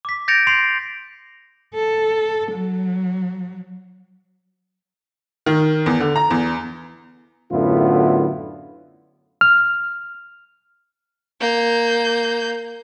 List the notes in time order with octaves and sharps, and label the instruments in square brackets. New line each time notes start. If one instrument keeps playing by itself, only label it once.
[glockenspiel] D6 B6
G6 A6 A#6 C#7 D7 F7
C6 C7 D7 F7
[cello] A4
F#3
[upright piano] D#3
E2
D3
A#5
E2
[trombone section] F#2 A2 D3 B3 E4 F4
[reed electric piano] F6
[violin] A#3 G6